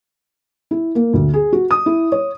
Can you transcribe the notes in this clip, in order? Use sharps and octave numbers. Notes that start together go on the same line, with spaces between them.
E4
A#3
D2
G#4
F#4
D#6
E4
C#5